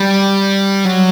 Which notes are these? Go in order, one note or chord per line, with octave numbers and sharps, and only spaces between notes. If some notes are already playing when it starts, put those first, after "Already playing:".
Already playing: G3
F#3